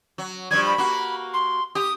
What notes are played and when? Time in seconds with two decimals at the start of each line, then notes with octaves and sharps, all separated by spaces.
0.18 F#3
0.51 G2 F3 G3 G#6
0.65 B5
0.78 A#3 F#4
1.33 C6
1.75 G4 D#6